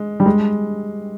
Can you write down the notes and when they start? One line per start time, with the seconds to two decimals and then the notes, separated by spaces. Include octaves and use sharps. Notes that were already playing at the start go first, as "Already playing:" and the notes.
Already playing: G#3
0.20 G3
0.26 G#3